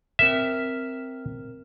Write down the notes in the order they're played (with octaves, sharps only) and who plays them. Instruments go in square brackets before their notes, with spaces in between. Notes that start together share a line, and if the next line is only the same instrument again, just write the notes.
[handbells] C4 A#4 F6 [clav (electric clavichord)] E5